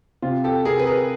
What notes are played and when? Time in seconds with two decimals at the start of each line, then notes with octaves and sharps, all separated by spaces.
0.22 C3 F4
0.44 G4 A4
0.65 C3 G#4 A#4
0.79 B4
0.87 G#4 A#4